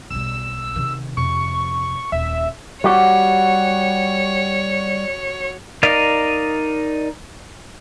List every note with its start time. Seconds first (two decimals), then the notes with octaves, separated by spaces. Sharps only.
0.10 B1 G3 E6
0.76 C3 D#3
1.17 F2 C3 C#6
2.12 D#1 E5
2.84 G3 F#4 G4 C#5
5.83 D#4 A#4 D5 D#5 F5